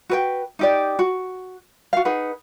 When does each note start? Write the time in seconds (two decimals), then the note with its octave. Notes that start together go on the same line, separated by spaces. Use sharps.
0.09 F#4 B4 G5
0.59 D#4 G4 D5
0.99 F#4
1.93 F#4 F5
2.05 D#4 G#4 B4 F#5